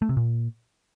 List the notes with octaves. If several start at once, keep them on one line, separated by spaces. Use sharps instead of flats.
A3
C3
A#2